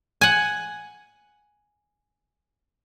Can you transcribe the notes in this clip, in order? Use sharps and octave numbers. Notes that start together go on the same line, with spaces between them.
F#5 G#5